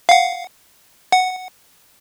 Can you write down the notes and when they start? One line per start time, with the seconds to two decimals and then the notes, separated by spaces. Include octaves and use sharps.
0.09 F5 F#5
1.12 F#5